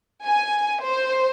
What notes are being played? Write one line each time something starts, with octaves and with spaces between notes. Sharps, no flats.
G#5
C5